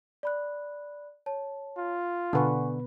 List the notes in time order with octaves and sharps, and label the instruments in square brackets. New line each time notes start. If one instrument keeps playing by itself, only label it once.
[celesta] D5 B5 F#6
C#5 A5
[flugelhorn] F4
[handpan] B2 B4 [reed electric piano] D3 [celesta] F#5 G#5 C#6